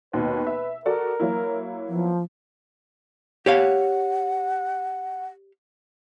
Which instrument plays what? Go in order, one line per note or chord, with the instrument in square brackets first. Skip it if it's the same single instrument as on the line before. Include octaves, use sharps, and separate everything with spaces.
[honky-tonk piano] D#2 B2 [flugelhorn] B4
[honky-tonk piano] E5
[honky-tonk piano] F#4 A4 D5 [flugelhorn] A#4
[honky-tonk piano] F#3 A#3 E4
[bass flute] F3 [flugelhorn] B3
[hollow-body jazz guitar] G4 C#5 F5 [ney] F#5